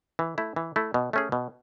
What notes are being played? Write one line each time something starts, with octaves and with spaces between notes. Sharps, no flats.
E3
A3 E4
E3
A3 E4
B2
A3 C#4 G#4
B2